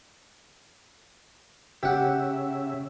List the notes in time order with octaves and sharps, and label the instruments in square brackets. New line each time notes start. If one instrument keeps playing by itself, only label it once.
[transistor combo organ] C#3 E5 [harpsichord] G4 F#5